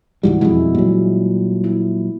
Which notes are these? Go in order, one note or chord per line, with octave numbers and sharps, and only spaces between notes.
C#2 G#2 E3 G3 E4 F#4
E1 F2 G3 G#3 E4
A#2 F#3 G3
E4